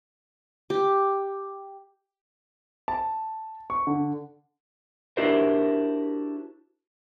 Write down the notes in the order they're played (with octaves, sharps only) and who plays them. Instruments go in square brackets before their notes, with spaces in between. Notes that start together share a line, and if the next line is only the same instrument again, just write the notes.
[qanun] G4
[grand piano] A5
C#6
D3
[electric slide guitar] D4 E4 F#4 G4 A#4 C5